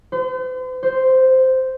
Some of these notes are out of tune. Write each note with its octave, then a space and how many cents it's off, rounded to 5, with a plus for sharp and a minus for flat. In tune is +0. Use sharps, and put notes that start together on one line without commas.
C5 -45
C5 -5